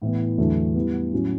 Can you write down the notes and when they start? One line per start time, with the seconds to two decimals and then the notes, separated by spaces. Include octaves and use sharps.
0.02 A2 E3 B3
0.38 E2 D3 F#3 A3
0.75 E3 G3 B3
1.12 A2 F#3 C#4